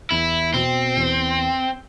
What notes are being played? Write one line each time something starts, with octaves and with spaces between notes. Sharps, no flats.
E2 E4
B2 C4
E2